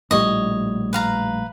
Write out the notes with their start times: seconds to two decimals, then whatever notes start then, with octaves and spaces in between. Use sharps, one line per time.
0.11 A#1 A2 G3 C#5 D#5
0.93 B4 F5 A#5